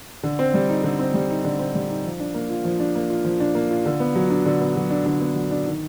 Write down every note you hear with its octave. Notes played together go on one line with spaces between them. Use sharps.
D3
C4
G3
D#4
D3
C4
G3
D#4
D3
C4
G3
D#4
F3
D4
A#3
F4
F3
D4
A#3
F4
F3
D4
A#3
F4
D3
B3
F#3
D4
D3
B3
F#3
D4
D3
B3
F#3
D4
D#3